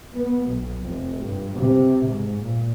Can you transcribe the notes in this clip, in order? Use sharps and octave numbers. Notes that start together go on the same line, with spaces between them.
B3
B1
F1
G2
C3
G#2
A#2